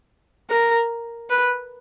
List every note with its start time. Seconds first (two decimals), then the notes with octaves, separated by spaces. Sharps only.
0.50 A#4
1.30 B4